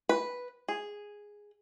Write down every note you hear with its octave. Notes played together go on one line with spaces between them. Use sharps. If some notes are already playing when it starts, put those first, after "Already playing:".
B4
G#4